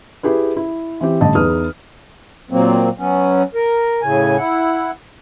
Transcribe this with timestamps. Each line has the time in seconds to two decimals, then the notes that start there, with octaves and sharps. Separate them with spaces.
0.23 E4 G4 G#4 B4
0.57 E4
1.01 E3 C4 G4
1.21 A1 D3 G3 G4 D#5 A5
1.35 E2 D#4 G#4 B4 D#6 F6
2.51 A#2 F#3 A#3 C4
2.98 F#3 B3 C#4
3.55 A#4
4.02 A2 C#3 G#5
4.37 E4 F#5